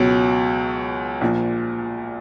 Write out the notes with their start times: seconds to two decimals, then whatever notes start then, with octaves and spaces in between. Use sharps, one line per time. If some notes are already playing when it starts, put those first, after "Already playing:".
Already playing: C#2 B2 F#3
1.21 A#1 A#2 F3